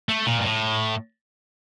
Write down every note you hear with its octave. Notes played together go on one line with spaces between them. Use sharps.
A3
A#2
G2
A2